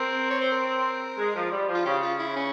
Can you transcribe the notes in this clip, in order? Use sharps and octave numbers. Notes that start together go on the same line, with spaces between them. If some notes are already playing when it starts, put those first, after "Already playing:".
Already playing: C4 A#4
C#5
C5
A#4
G#3
F3
G3
F3
F4
C#3 G4
F4
E4
C#4